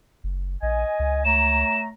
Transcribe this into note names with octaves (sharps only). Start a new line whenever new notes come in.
F#1
A#1 D#5 G#5
C#2
A3 C#5 A#5 E7